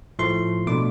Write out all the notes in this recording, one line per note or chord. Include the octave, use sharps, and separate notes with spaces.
A2 F3 A3 C6
B2 A3 D4 D6